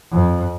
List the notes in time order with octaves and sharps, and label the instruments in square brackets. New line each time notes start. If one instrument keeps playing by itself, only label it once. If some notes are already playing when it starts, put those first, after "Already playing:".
[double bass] F2